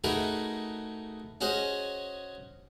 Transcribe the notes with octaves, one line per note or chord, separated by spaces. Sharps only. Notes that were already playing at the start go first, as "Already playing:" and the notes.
A3 D#4 F#4 G#4 A#4 B4
C#4 F#4 G#4 C5 D#5